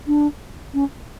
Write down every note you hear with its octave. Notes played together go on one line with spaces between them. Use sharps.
D4
C#4